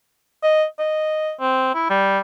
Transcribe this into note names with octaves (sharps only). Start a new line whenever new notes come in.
D#5
D#5
C4
E4
G3